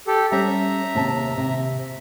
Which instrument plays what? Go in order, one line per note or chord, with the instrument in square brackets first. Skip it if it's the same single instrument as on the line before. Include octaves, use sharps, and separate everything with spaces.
[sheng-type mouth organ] G4 A4
[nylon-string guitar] G3 C#4 C#5 [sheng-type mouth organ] E5 A#5
[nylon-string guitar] D#2 C3 A5
C3